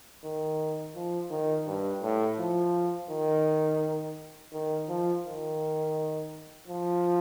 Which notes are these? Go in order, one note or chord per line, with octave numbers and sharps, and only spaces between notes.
D#3
F3
D#3
G2
A2
F3
D#3
D#3
F3
D#3
F3